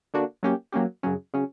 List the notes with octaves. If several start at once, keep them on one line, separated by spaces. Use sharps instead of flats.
D3 A#3 D4 F#4
F#3 A#3 C#4 G4
F#3 A#3 C#4 G4
F#2 C#3 F#3 C#4
C#3 F#3 C#4